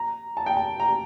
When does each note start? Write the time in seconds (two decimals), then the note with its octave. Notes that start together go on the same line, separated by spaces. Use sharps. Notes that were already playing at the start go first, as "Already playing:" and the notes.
Already playing: A#5
0.37 A5
0.46 G5
0.57 A5
0.80 A#5